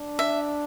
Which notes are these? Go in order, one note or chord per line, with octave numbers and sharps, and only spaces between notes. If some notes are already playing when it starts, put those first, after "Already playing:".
Already playing: D4
E5